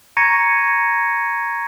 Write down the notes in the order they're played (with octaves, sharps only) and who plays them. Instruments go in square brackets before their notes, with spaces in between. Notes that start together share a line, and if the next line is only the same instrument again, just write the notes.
[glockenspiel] A#5 C#6 G#6 A#6 C#7 D#7